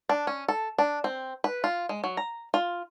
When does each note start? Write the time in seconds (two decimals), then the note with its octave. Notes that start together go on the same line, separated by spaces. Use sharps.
0.09 D4
0.27 C#4
0.48 A4
0.79 D4
1.04 C4
1.44 B4
1.64 F4
1.89 G#3
2.04 F#3
2.17 A#5
2.54 F4